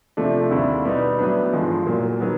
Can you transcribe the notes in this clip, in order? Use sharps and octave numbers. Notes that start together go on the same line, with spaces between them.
C3 F3 A3 D4
D#2 D3 G3 C4 E4
B2 G3 B3 D#4
A2 F#3 B3 D4
A1 G2 D3 F3 G#3
A#2 F#3 A#3
D#3 F#3 B3